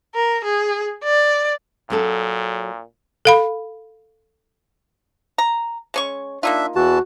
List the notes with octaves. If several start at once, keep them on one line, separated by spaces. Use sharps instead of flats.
A#4
G#4
D5
A#2 F#3 C#4 A4
A4 F5 B5
A#5
G#3 C#4 C#6
A#3 D4 D#4 F4 E5
E2 E3 F#4 A5